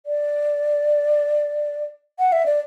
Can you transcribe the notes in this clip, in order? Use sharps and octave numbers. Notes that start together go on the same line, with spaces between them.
D5
F#5
E5
D5